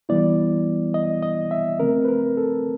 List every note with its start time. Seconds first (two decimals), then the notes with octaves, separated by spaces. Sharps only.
0.09 E3 G3 B3 E4 D5
0.94 D#5
1.23 D#5
1.51 E5
1.80 C#3 F3 A3 C4 A#4
2.05 B4
2.08 A#4
2.37 A4